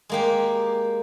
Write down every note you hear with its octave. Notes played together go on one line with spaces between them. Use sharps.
G#3 A#3 G4